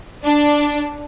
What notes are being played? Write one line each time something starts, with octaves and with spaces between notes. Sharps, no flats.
D4